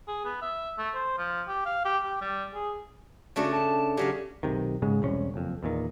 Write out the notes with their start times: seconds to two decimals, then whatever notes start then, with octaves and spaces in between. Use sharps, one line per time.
0.07 G#4
0.25 B3
0.42 E5
0.78 A3
0.95 C5
1.18 F3
1.48 G4
1.65 F5
1.85 G4
2.03 G4
2.21 G3
2.54 G#4
3.36 C#3 A3 D4 F#4
3.53 A5
3.97 C#3 F#3 G4 F5
4.43 B1 C3 D#3
4.82 G#2 C#3 G#3
5.02 E1 C2 C#4
5.34 F#1 F2
5.63 E2 A#2 D#3